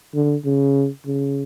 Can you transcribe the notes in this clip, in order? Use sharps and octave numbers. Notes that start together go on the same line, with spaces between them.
D3
C#3
C#3